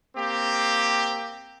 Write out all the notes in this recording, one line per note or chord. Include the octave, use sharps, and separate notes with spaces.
A#3 C4 G4